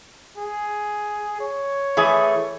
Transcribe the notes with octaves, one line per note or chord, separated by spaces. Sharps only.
G#4
C#5
E3 A3 G#4